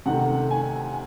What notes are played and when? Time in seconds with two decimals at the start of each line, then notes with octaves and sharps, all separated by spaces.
0.06 C3 D#3 A3 F#5
0.51 G#5